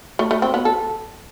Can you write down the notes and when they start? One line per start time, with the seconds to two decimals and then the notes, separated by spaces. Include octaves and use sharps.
0.19 A3
0.31 A3
0.42 C4
0.54 B3
0.65 A4